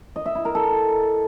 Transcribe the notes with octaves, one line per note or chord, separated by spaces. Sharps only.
D#5
E5
E4
A#4
A4